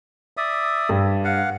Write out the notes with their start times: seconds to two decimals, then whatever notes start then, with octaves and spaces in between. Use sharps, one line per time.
0.37 D5 E5 D#6
0.89 G2
1.24 F5 F#5